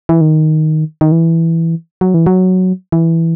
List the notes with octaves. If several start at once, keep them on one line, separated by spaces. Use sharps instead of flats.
E3
D#3
D#3
E3
F#3
E3
F#3
E3